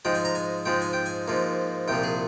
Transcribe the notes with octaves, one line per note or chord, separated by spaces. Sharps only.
G#2 F3 G#3 G5
G#5
A#5
G#5
G#2 F3 G#3 G5
G#5
G5
G#5
G#2 F3 A#3
C2 A#2 F3 G5
G#4